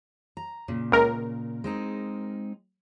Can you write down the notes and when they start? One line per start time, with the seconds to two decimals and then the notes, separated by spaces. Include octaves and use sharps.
0.37 A#5
0.68 A#2 C#3
0.92 C#2 A#4
1.64 G#3 C4 D#4